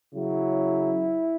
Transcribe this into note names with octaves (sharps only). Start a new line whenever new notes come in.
C#3 F#3 E4